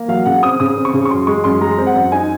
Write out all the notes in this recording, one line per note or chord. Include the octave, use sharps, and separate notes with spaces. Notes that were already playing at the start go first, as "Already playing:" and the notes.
Already playing: A#3
F#3 F5
C#3 F#5
C4 D#6
C#3 D#6
C4
C#6
C#3
C#6
F#2 C6
G#3 C#6
F#2 C6
G#3 A#5
C4
F#5
F#2
D#4 G#5